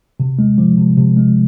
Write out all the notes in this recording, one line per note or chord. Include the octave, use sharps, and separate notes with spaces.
C3
G#3
F3
C3
C3
G#3